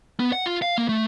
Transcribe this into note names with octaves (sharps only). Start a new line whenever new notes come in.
B3
F#5
F4
F5
A#3
A3